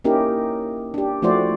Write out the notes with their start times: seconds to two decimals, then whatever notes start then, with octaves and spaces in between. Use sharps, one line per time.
0.04 A#3 C#4 D#4 E4 G4 A#4
0.94 D4 G4
1.22 F3 A3 E4 F#4 C5 D5